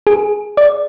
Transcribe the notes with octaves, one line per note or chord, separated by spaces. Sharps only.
G#4
D5